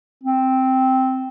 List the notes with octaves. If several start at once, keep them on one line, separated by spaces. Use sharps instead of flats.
C4